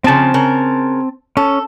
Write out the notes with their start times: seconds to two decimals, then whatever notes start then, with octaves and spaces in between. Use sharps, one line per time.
0.04 C#3 F3 C4 A5
0.34 C#3 A#4
1.37 C#4 A4